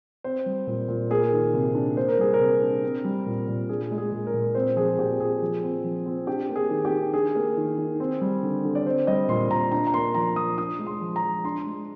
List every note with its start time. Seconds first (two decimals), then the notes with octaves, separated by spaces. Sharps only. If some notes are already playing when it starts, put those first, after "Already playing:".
0.24 C4 C5
0.46 G3
0.67 A#2
0.89 A#2
1.10 A#3 G#4
1.32 D#3
1.54 C3
1.75 D4
1.97 A#3 C5
2.08 A#4
2.18 G3 G#4
2.34 A#4
2.39 C3
2.61 D4
2.83 C4
3.04 G3
3.26 A#2
3.48 A#2
3.69 D4 G#4
3.91 G#3
3.98 G#4
4.12 A#2
4.27 A#4
4.34 A#2
4.55 C4 C5
4.76 F3 G#4
4.99 A#2 G4
5.20 A#2 G#4
5.42 F3
5.63 C4
5.84 F3
6.06 C4
6.27 D4 G4
6.49 A#3
6.56 G#4
6.70 D#3
6.85 G4
6.92 D#3
7.14 D4 G#4
7.35 A#3
7.57 D#3
7.78 D#3
8.00 C4
8.21 G3
8.43 D3
8.64 D3
8.75 D5
8.86 C4 C5
9.07 G3 D#5
9.29 A#2 C6
9.50 A#2 A#5
9.72 D4 A#5
9.87 A#5
9.94 A#3 C6
10.14 F3 A#5
10.36 F3 D#6
10.58 D4 D#6
10.79 G#3
10.87 C6
11.01 F3
11.16 A#5
11.22 F3
11.44 D4 C6
11.66 G#3